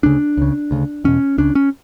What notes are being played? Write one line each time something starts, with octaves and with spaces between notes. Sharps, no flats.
D2 C#3 D4
C#2 C#3
D2 C#3
E2 B2 C#4
C#2 C#3 D4
C#4